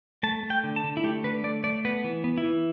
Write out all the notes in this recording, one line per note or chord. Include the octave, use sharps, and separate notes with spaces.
A3 A5
A3
G5
D3
A5
D3
E4
A3 G4
D3 B4
A3 D5
A3 D5
B3 B4
E3
B3
E4
E3